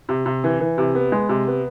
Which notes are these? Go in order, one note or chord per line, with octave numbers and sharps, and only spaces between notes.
C3
C3
E3
E3
C3
B3
G#3
C3
B3